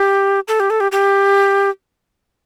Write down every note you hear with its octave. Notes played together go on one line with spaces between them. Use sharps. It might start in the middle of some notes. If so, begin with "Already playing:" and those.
Already playing: G4
A4
G4
A4
G4
G4